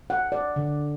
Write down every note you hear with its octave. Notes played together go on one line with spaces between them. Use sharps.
F#5
D5
D3